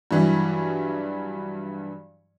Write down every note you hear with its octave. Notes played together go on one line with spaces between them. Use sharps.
G2 E3 F#3 G3